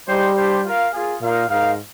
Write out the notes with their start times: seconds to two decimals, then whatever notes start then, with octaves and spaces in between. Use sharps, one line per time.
0.08 G3 G#3 D#4 G4 C5
0.36 D4 G4 C5
0.64 F4 A#4 F5
0.93 A#3 F4 G#4
1.21 A#2 A#3 D#4 A#4 F5
1.49 G#2 D#4 A#4 F5